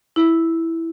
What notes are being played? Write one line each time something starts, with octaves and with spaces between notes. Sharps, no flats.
E4